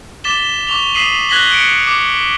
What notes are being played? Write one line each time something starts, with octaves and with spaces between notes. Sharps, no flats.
D6 A6 B6 E7 G7
C#6 D6 F7 G7
D#6 B6 C7 D#7 E7 F#7
F#6 G#6 A#6 B6 F#7 G7
C#7 D7
D6